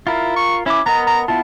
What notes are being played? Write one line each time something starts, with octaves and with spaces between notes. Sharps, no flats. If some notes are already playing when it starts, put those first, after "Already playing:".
E4 F4 A#4
C#6
C#4 E4 D6
B3 A#4 D#5 A#5
A#5
B3 E4 F4 A5